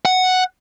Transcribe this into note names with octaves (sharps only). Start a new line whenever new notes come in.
F#5